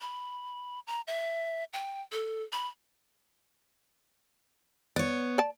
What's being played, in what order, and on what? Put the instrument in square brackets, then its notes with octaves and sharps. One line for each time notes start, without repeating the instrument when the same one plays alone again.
[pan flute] B5
A#5
E5
G5
A4
B5
[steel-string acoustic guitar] B3 C#5 [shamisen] D5
[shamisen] D5 A5